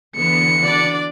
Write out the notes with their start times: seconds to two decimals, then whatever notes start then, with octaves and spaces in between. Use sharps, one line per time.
0.17 D3 E3 B3 C#7
0.65 D4 F#4 D5